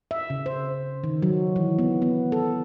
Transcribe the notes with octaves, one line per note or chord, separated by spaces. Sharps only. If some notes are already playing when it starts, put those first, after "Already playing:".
E5
C#3
C5
D#3
F#3
E3
B3
B3
A4